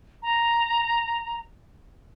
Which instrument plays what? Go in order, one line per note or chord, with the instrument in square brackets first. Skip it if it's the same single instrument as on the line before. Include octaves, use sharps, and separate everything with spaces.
[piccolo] A#5